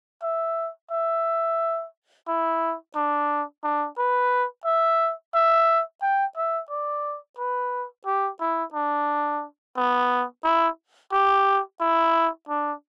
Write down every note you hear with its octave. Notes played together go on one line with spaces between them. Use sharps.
E5
E5
E4
D4
D4
B4
E5
E5
G5
E5
D5
B4
G4
E4
D4
B3
E4
G4
E4
D4